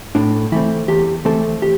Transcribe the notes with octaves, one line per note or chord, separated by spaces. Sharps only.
A2 D4
E3 A3 C4 E4
E2 G4
E3 A3 C4 A4
G4